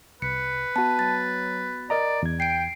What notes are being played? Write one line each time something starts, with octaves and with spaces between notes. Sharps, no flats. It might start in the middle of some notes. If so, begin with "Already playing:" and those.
C2 B4 C#7
B3 F#4 A5
F#3 A6
A#4 D5 D#5 A#5
E2 G#6
G5 C7 D7